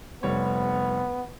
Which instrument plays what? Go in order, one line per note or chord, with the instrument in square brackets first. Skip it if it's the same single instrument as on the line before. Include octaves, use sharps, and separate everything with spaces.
[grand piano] F1 G3 C#5 [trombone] B3